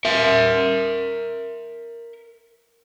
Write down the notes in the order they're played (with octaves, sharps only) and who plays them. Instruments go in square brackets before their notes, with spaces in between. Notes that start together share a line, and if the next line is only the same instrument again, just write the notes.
[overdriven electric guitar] A#4 E5